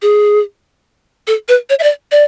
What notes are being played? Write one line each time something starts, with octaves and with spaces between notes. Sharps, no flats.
G#4
A4
B4
C#5
E5
D5
D5